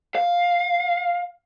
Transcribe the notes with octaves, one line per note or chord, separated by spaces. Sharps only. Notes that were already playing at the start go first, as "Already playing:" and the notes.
F5